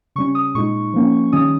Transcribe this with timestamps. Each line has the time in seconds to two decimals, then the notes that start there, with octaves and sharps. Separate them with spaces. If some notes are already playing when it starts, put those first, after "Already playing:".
0.16 C#3 G3 C#4 C#6
0.35 D#6
0.55 A#2 G#3 D#4 C#6
0.94 F3 A#3 C#4
1.32 D#3 G3 C#4 D#6